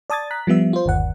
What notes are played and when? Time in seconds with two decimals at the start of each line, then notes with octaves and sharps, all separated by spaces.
0.10 D5 A5 D#6 G#6 A6
0.31 A#5 F#6 B6
0.47 F3 G3 B3 E5
0.73 F4 C5
0.86 G1 D#2 F#5